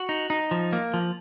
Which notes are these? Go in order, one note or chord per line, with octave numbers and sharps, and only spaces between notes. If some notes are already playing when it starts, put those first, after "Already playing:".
Already playing: F#4
D#4
D#4
F3
A#3
F3